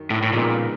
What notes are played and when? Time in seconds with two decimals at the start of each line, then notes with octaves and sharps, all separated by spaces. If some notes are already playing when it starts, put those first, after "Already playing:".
Already playing: F#2 D#3
0.10 A2
0.22 A2
0.33 A#2 C#3 F3 G#3 B3 D#4